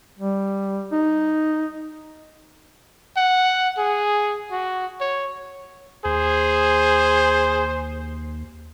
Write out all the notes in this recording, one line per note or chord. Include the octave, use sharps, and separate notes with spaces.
G3
D#4
F#5
G#4
F#4
C#5
D#2 G#4 C5